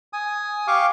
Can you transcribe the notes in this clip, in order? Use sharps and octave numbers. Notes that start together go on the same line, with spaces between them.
G#5 D#6
G4 F5 C#6 D6